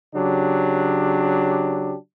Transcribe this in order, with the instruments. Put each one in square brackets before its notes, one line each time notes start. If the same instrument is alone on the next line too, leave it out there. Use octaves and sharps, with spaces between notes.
[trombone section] C#3 F#3 D4 G4